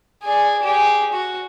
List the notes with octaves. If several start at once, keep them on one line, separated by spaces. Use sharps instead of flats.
G#4 D5
G4 G#4
F#4